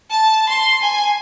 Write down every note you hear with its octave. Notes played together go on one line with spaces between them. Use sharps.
A5
C6
G#5